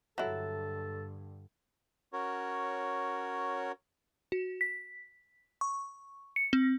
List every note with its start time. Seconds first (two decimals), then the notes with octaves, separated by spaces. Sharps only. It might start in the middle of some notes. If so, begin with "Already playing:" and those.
0.18 G2 D3 F#3 E4 A4
2.13 C#4 F#4 A#4 C#5
4.32 F#4
4.61 B6
5.61 C#6
6.36 C#7
6.53 C4